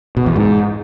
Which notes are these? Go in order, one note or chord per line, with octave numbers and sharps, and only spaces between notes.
B2
E2
G#2